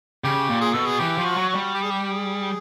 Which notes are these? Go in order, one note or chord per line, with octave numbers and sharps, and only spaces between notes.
C#3 G4
A#2
G#4
B2 A4
G#4
E3 G4
F3
F#4
F#3
F#4
G3
G4
G#4
G4
G#4